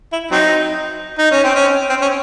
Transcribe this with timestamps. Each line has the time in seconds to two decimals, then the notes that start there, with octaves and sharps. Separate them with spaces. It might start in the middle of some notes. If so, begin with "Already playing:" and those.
0.13 E4
0.31 F#3 C4 D#4
1.19 D#4
1.31 C#4
1.44 C4
1.55 C#4
1.89 C4
2.02 C#4